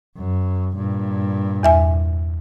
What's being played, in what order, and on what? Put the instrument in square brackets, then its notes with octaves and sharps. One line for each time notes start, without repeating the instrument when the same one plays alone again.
[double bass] F#2
G2 A#2
[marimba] E2 E5 G#5